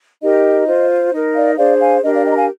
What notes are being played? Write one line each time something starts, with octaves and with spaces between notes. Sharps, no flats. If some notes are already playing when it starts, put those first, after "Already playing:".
D#4 G4 A#4 D#5
F4 C5
D#4 A#4
D5 F5
D4 G#4 C5 D5 F5
F5 G#5
D4 G4 A#4 D#5
D5 F5
D#5 G5
A#5
F5 G#5